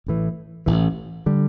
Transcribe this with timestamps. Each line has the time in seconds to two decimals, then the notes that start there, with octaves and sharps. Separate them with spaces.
0.06 A1 A2 E3
0.66 A1 A2 E3
1.26 D3 G3